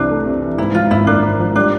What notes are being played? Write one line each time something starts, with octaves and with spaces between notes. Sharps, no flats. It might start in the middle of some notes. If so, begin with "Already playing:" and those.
Already playing: C2 C3 E3 D4
A3
C3
E3
G#2 E4
F3 F4
G#1 E4
A#3 D4
G#2
F3
G3 D4